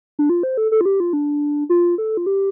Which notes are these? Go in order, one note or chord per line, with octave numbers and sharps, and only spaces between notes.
D4
F4
C5
A4
A4
F4
G4
F4
D4
F4
A4
F4
G4